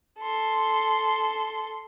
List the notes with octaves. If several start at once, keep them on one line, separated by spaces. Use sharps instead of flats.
A4 C6